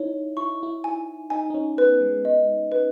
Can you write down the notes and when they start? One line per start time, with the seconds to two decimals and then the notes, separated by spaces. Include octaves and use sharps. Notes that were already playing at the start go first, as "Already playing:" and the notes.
Already playing: D#4 E4 C#5
0.37 E4 C#6
0.63 E4
0.84 G#5
1.30 D#4 G#5
1.50 D#4
1.54 C#4
1.77 B3 B4
2.01 G#3
2.25 D#5
2.72 B4